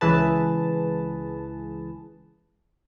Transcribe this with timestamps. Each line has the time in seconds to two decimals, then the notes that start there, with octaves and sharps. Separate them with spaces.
0.01 C#2 E3 G#4 B4 A5